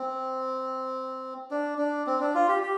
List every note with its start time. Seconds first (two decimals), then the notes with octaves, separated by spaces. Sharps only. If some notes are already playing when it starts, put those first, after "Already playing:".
Already playing: C4
1.51 D4
1.78 D4
2.07 C4
2.21 D4
2.35 F4
2.48 G4
2.63 G4